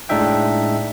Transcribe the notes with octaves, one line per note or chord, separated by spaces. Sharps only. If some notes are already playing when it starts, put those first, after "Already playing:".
A2 G#3 D4 D#4 E5 G5